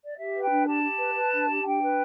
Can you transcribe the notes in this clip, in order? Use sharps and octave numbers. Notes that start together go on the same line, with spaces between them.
D5
G4 E5
B4
G5
D4
G4 A5
G4
B4
B4
D4
G4
D4 G5
B4